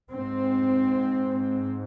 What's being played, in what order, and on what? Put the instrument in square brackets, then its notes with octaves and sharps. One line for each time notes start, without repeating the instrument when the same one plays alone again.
[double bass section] G#2 C4